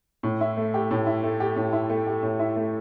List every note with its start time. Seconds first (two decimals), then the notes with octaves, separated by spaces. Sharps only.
0.23 A2
0.41 E4
0.57 A3
0.74 G4
0.91 A2
1.07 E4
1.24 A3
1.40 G4
1.56 A2
1.73 E4
1.90 A3
2.07 G4
2.23 A2
2.40 E4
2.56 A3